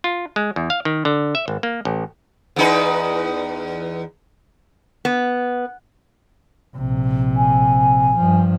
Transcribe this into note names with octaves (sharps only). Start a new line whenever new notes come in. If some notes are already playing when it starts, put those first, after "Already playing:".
F4
G#3
E2
F5
D#3
D3
E5
G#1
A#3
A1
E2 D#4 B4
B3
A#1 C3
G#5
G2 F3